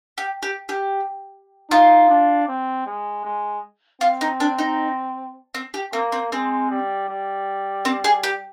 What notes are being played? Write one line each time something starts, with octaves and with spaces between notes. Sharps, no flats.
G4
G4
G4
D#4 F4
D4
C4
G#3
G#3
C4 F4
D#4
D4
D#4
C4
G4
A#3 C4
C4
G#3 C4
G3
G3
C4
G#4
G4